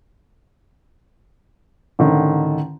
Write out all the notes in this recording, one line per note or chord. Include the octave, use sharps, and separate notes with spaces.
A1 D3 D#3